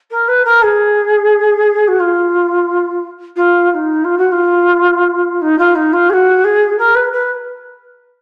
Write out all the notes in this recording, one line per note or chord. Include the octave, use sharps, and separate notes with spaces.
A#4
B4
A#4
G#4
F#4
F4
F4
F4
D#4
F4
F#4
F4
D#4
F4
D#4
F4
G#4
F#4
G#4
A#4
B4
B4